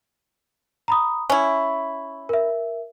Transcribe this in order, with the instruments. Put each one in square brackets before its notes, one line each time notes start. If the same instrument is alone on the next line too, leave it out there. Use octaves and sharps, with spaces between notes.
[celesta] A#5 B5 D#6
[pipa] C#4 E4 [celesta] C#6
[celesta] A#4 E5